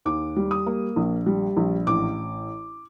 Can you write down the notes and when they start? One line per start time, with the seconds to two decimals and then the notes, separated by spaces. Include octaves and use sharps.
0.05 D#2 D6
0.36 G3
0.51 D#6
0.66 A#3
0.96 A#1
1.26 G3
1.57 A#1
1.87 A1 D6